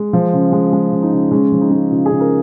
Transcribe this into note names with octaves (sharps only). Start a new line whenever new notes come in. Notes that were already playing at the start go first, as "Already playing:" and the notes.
Already playing: G#3
F3
C#3
G#3
G#3
C#3
D#4
C#3
G#3 C#4
F3
D#4
G#3
C#3 F4
G#4
C#3
A#4